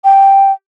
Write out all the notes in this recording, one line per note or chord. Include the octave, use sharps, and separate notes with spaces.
G5